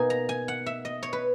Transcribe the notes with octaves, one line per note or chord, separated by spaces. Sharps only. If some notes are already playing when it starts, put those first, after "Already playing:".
Already playing: B2 A#3 D#4 G#5
A#5
G#5
F#5
E5
D#5
C#5
B4